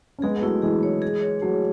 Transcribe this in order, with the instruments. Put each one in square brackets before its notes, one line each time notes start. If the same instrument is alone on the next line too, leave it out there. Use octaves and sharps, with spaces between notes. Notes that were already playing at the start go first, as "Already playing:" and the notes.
[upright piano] C#4
[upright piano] G#3 B3 [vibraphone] G#4
[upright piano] B3
[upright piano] F#3 A3 [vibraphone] E4
[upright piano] E3 G#3 [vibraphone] G#4
[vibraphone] C#5
G#4
C#5
[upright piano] F#3 [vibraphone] A3